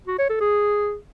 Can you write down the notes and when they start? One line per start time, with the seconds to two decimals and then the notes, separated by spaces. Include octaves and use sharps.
0.07 F#4
0.18 C#5
0.29 A4
0.40 G#4